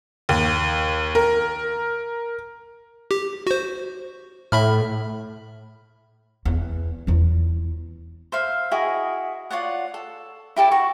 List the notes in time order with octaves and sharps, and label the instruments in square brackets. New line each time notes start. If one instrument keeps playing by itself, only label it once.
[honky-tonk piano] D#2
A#4
[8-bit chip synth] G4
F#4 C5
[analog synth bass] A2 [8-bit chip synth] E5 B5 F6
[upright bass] E2
E2 F4
[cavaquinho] C5 E5 F5
E4 F#4 G#4 D#5
F4 C#5 D5 F#5
A4
E4 G4 A4 A5
F#4 C#6